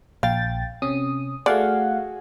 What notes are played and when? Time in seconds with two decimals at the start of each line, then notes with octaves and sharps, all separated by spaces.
0.23 A#1 F5 G5 A6
0.82 C3 C#4 D#6
1.46 A3 F#4 G#4 D5 F5 F#5 E6